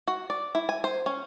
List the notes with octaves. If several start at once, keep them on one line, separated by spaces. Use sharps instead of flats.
F#4
D5
E4
G#5
C5
C#4